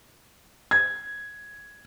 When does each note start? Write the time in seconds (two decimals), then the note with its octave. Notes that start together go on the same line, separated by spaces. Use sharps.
0.71 G#6